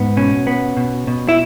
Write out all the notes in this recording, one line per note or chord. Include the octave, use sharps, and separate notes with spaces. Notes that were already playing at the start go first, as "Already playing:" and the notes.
Already playing: G#2 B3
B2 C#4
B3
B2
B2
E4